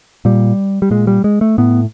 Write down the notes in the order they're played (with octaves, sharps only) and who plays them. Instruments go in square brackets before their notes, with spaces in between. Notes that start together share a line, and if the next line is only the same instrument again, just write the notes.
[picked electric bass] A#2 G3
G3
A#2 G#3
G3
G#3
A3
A2 B3